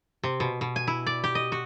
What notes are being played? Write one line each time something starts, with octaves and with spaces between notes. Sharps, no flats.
C3
B2
B2
G#5
E4
D5
G4
D#5
F#4